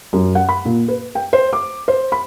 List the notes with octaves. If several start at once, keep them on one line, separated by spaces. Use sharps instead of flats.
F#2
F#5
B5
A#2
B4
G5
C5
D6
C5
B5